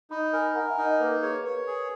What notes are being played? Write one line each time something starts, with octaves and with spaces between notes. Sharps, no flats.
D#4 B5 D#6
A#4 G#5 B5
A#4 F#5 A#5
E5 G#5
D#4
D#5 F#5
A#3 B4
A#4
G#4 C#5
A#4
B4 C#5
G#4